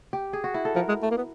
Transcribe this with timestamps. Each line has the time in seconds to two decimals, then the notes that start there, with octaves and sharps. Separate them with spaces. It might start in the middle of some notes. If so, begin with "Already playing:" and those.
0.13 G4
0.33 G#4
0.44 F#4
0.54 E4
0.65 A4
0.76 F3 A#4
0.89 G#3
1.03 A3
1.11 A#3
1.17 B3